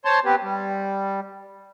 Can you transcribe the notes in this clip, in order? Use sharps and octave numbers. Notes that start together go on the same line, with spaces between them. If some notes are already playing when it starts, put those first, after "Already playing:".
C5 C#5 A5 C6
B3 C4 G4 B4
G3